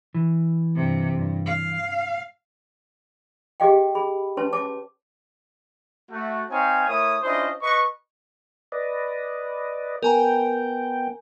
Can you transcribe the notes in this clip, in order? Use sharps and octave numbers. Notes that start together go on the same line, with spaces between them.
E3
G2 C3
G2
F5
G4 G#4 D#5 F5 G5
G#4 B5
C#4 B4 C#5 A5 C6
C#5 A5 D6
A3 F#4
C4 D#4 C#5 F5 G#5
A3 E4 A#4 C#5 D#6
C#4 D4 E4 F4 C5 D#5
B4 D#5 C#6
B4 D5 D#5
B3 A#4 G5 G#5 A#5